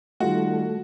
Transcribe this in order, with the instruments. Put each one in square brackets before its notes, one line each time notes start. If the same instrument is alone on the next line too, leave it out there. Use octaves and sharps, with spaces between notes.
[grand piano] D#3 G3 F4 [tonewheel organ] A3 [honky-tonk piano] F#4